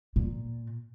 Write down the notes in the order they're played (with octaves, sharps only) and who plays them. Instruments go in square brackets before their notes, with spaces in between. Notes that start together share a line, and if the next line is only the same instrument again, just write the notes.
[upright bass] A#2